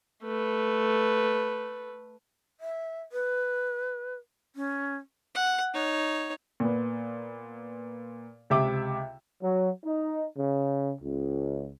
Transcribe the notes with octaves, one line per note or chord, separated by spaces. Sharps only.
A3 B4
E5
B4
C#4
F#5
D#4 C#5
A#2 B3
C#2 C3 E5 D6
F#3
D#4
C#3
C#2